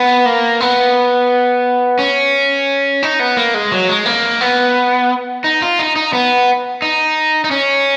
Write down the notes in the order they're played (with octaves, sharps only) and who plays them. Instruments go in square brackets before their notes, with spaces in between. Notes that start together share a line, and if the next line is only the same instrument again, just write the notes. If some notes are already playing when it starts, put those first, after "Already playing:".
Already playing: [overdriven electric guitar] B3
A#3
B3
C#4
D#4
B3
A#3
G#3
F#3
G#3
A#3
B3
D#4
F4
D#4
D#4
B3
D#4
D#4
C#4